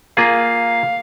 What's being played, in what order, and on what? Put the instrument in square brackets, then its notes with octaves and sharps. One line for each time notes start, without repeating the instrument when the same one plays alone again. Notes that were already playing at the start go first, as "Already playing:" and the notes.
[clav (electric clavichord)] A#3 F4 G#4 [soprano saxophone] F5